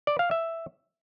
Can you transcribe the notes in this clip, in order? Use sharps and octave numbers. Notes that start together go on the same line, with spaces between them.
D5
F5
E5